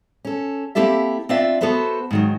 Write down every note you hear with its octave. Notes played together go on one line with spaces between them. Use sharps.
C#4 A4
A#3 C4 E4 G4 A4 E5
C4 D4 F4 D5 E5
B3 F#4 A4 B4 C5
G#2 D#3 F#3